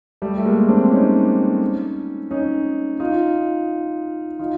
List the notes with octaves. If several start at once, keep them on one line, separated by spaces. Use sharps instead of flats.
G3 A3
A3
G#3 A#3
C4 D4
C#4 D#4
C#4 D#4
D#4 F4
D#4 F4